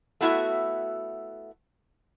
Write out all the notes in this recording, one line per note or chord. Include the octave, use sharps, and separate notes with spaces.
A3 B3 E4 F#4 E5